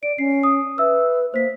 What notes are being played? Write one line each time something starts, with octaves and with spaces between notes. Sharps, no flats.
D5 D7
C#4 C7
D#6
B4 E5 E6
A#3 C5 B6